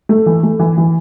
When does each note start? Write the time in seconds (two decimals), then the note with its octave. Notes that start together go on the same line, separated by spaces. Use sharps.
0.09 A3
0.26 E3
0.43 A3
0.59 E3
0.78 E3